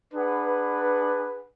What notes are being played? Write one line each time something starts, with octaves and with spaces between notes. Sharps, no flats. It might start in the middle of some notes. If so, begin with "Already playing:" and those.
D4 G#4 B4 D5 F#5